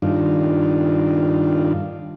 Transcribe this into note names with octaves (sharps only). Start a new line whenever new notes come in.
G2 D#3 D4 F4